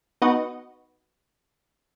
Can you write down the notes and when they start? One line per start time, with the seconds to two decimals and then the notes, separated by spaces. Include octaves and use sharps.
0.22 B3 D#4 F#4 B4 D#5